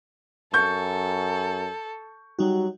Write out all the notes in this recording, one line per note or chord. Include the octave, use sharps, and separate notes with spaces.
F#2 A4 C#6 G6
F#3 G3 D#4 F#4